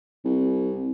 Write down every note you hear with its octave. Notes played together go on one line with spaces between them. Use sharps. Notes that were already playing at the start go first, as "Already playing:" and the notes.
C2